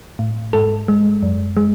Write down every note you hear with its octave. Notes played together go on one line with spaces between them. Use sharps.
A2
G#2 A4
G#3
F#2
G#3